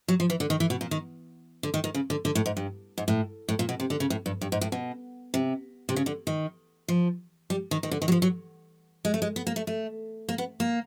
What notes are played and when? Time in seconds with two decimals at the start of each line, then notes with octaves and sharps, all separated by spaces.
0.08 F#3
0.20 F3
0.30 E3
0.40 D3
0.50 D#3
0.60 E3
0.70 B2
0.81 A#2
0.91 D#3
1.63 D3
1.74 D#3
1.84 D#3
1.94 C#3
2.10 D3
2.25 D3
2.35 A2
2.46 G#2
2.57 G2
2.98 G#2
3.08 A2
3.49 A2
3.59 A#2
3.69 B2
3.80 C3
3.90 D3
4.00 C#3
4.10 A2
4.26 G2
4.41 G2
4.52 G#2
4.61 A2
4.72 B2
5.34 C3
5.89 C3
5.96 C#3
6.06 D3
6.27 D#3
6.88 F3
7.50 G3
7.71 D#3
7.83 D#3
7.91 D3
8.02 D#3
8.08 F#3
8.12 F3
8.22 F#3
9.05 G#3
9.14 A3
9.22 G#3
9.36 B3
9.47 A#3
9.56 A3
9.67 A3
10.29 A#3
10.38 B3
10.60 A#3